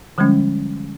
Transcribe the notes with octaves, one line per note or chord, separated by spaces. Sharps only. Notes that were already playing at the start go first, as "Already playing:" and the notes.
D3 F3 G3 G#3 C#4